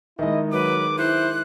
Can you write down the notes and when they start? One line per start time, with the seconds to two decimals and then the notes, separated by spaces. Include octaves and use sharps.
0.19 D#3 G#3 E4 D#5 E5
0.52 F#3 B4 D6
0.98 E4 C5 F#6